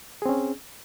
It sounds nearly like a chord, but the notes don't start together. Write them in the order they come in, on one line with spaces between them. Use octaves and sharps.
G#4 C4 C#4